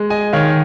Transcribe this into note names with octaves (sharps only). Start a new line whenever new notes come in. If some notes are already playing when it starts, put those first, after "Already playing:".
Already playing: G#3
D#5 G#5
D#3 C#5 F5